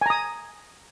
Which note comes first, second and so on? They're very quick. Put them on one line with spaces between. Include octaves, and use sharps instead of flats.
G#5 A#5 D#6